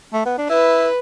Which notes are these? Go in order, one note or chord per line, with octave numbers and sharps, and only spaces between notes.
A3
B3
D4
E4 B4